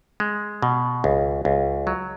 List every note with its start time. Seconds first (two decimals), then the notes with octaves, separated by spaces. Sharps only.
0.20 G#3
0.62 B2
1.04 C#2
1.45 C#2
1.87 F#3